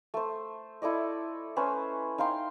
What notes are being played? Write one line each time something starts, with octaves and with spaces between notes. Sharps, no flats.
A3 C5
E4 A4 D5 D#5
A3 C#4 B4 C5
D#4 F5 G5 C6